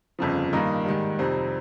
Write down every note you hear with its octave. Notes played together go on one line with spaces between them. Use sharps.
G1 F2 C#3 F3
G2 D#3 A#3 D#4
G#2 D#3 G3
F2 C3 G3 C4 D#4